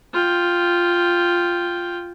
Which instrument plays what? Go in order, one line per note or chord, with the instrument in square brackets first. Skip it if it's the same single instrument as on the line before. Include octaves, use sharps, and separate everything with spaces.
[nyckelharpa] F4 G5